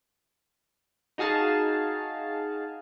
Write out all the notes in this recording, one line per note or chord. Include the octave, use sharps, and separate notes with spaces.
D#4 F#4 G#4 F5 A5